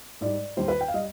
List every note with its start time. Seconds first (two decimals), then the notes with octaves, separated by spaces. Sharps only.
0.21 G#2 G3 D5
0.57 D#2 D#3 G3 C5
0.68 B4
0.81 G5
0.88 F5
0.94 G3 D#5